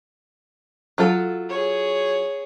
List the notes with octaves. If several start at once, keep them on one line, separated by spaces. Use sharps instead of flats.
F#3 F4 A4
G#4 C#5